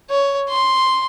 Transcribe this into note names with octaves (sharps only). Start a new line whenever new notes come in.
C#5
C6